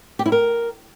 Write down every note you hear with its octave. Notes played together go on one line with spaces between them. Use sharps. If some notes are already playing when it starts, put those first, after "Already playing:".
G4
E4
A#4